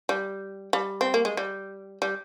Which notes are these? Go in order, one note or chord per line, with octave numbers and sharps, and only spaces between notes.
G3
G3
C4
A#3
G#3
G3
G3